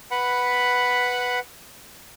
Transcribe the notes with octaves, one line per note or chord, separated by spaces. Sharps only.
B4 F#5 B5